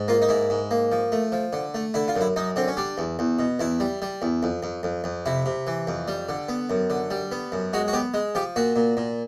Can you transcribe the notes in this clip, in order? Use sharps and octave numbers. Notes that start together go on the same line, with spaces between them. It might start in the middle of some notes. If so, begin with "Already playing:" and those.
Already playing: G#2
A#3 F4
D#4
G#2 E4
G#2
A#3
F3
A3
F3
D3
A3
D3 E4
F4
F#2
E4
F#2 D#4
D3 C4
C#4
G3 D4
E2
E2
B2
E2 E4
G3
G3
E2
F2
F2
F2
F2
C3 E4
C3
E3
F2
G3
D3
B3
F#2
D3
G3
B3
F#2
G#3 F#4
F#4
B3 G4
G#3
F3 G4
A#2 F#4
A#2
A#2